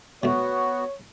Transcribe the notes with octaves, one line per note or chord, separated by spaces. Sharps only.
B2 A3 B3 F#4 C#5